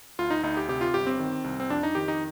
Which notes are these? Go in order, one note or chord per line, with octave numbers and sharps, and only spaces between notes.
D2 F4
D#4
D2 D#4
G4
C3 G4
F4
G1 G4
C4
D#3
C2
C4
F2 D4
D#4
D#3 G4
D#4